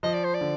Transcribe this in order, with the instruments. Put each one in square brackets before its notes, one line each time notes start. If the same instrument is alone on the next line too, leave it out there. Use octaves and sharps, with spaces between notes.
[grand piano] F3 [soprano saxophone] D#5
[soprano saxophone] D5
C5
D5
[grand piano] D3